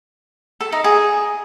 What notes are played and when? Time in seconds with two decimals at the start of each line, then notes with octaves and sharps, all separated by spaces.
0.61 A4
0.72 D#4
0.84 G#4